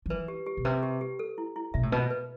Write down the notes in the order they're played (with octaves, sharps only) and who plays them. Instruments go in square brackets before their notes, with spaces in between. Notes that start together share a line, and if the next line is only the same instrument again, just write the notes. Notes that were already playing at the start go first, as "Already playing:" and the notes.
[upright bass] F3
[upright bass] E3 [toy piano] B4
[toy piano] G4
G4
[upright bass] B2
[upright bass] C3 [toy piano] B4
[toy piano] G4
G4
A4
E4
E4
[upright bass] B2 [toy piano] E5
[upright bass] A2
[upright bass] B2 [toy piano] B4
[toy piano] B4